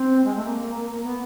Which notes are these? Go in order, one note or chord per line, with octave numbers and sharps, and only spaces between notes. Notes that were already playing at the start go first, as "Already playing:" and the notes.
Already playing: C4
G#3
A3
A#3
A#3
A#3
B3